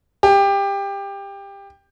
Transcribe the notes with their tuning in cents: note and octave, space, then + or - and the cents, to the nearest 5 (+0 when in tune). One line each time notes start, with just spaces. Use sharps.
G4 +20